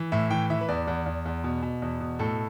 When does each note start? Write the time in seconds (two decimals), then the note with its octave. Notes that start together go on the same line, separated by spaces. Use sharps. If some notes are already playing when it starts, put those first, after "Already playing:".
Already playing: E3
0.12 A2 E5
0.31 E3 G5
0.50 E3 E5
0.61 B4
0.69 E2 D5
0.88 E2
1.06 E2
1.25 E2
1.44 B2
1.63 B2
1.82 E2
2.01 B2
2.19 A2 A4